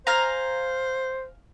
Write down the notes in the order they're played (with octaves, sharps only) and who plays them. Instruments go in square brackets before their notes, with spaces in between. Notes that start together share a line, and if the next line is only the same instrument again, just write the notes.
[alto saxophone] C5 [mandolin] F5 G#5 A#5